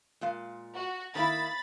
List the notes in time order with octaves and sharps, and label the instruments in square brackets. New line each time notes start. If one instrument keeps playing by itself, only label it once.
[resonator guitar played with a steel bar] A#2 G#3 F5
[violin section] F#4
[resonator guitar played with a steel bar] D#3 A#3 E4 [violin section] B5 A6